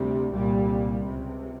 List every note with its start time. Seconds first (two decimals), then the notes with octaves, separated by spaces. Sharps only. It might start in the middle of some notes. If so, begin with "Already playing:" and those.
Already playing: D2 C3 G3
0.32 C2 A#2 G3
1.03 C#2 C3